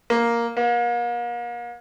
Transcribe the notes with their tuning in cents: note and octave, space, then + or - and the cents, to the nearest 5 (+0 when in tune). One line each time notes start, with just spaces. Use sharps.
A#3 +5
A#3 +40